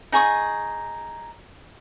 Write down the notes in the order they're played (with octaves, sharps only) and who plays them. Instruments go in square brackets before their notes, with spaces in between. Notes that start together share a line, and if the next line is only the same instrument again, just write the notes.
[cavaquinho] D#4 G#4 C#6 D#6